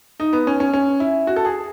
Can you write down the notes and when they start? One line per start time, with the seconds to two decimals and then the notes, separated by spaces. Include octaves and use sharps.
0.20 D#4
0.33 B3
0.47 C#4
0.60 C#4
0.73 C#4
1.00 E4
1.27 F#4
1.36 A4
1.45 G#4